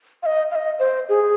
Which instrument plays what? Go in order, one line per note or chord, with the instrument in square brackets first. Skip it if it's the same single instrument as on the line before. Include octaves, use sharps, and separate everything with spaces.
[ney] F5
D#5
F5
D#5
C5
G#4